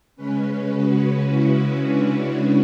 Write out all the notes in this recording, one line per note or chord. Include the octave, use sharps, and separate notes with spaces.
C#3 G#3 C#4 B4
F#4
E4
D4